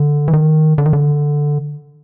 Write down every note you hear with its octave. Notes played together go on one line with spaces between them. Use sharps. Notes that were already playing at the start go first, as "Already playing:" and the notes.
Already playing: D3
E3
D#3
D3
D#3
D3